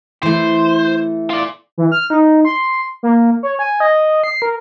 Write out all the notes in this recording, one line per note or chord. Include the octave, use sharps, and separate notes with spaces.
E3 A3 C5
F4 D5
E3
F6
D#4
C6
A#3
C#5
G#5
D#5
C7
A#4